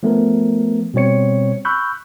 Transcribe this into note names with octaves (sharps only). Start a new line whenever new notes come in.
F3 A3 B3 A#4
B2 G3 C4 C#5 C#7
B5 C#6 E6 F#6 G6